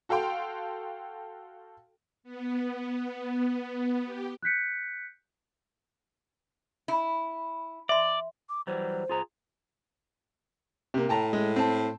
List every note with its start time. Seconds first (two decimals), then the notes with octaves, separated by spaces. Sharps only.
0.09 F#4 A4 F5 G5 C6
2.24 B3
4.05 G4
4.42 F#6 G6 B6 C#7
6.88 E4
7.89 D5 E5 C6
8.49 D6
8.67 E3 F#3 G3 C5
9.09 F4 G#4 A#5
10.94 C3 A#3
11.09 A2 G5 A5 A#5
11.33 G#3
11.56 C4 A5